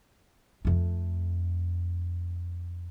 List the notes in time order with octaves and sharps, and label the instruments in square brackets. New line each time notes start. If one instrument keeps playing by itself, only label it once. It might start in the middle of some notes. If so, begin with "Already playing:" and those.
[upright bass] F2 A3